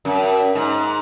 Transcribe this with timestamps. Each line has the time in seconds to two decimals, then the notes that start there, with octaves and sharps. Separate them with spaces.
0.05 F#2
0.55 G#2